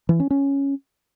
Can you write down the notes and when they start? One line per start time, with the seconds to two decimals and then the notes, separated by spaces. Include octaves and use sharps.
0.09 E3
0.20 C#4
0.30 C#4